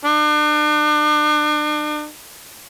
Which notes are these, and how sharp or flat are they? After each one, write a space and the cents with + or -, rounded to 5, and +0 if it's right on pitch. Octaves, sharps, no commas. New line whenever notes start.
D4 +40